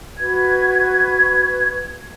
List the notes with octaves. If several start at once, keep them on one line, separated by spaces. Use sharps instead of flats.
F#4 B4 G#6